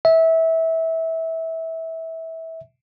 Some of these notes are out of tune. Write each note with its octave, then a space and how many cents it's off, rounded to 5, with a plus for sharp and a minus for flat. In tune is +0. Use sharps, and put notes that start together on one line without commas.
E5 -20